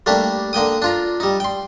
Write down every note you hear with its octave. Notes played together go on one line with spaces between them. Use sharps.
G3 A3 A#3 D4 G4
D3 A#3 G5 D#6
D4 F4 A#5
G3 D#4
G5 C6